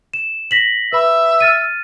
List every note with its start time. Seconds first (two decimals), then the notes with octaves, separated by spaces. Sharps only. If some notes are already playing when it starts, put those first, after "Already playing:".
0.14 E7
0.51 A#6 B6 F#7
0.93 B4 E5 B5
1.40 F6 A6 D#7